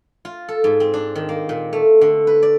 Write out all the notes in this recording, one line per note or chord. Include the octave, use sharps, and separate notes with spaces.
F4
A4
G#2
C4
D4
D#3
A#3
A#2
A3
D3
B4
D5